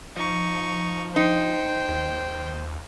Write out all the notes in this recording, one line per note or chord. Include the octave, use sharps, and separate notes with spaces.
F3 D#4 C#6
D#4 C5 G5
D#2